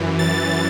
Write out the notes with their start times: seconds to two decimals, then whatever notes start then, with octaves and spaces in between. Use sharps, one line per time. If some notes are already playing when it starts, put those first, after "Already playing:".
Already playing: F#2 E3
0.19 A6